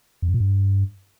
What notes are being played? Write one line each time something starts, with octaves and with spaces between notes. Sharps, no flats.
F2
F#2
A#2
G2